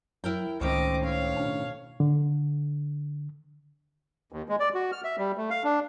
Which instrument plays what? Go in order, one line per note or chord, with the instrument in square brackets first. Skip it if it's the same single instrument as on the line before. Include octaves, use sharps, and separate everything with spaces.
[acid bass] F#3 [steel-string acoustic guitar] E4 A#4 G5
[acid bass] C#2 [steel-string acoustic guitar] A2 D#3 C#4 [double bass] C4 [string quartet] D#5 D6
[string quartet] C#5 F5
[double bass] B2 [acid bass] D4
[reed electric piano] D3
[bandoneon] D#2
G#3
D5
F#4
F6
E5
G3
A3
F5
D4